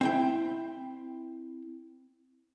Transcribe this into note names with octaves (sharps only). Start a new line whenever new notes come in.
C4 E4 G5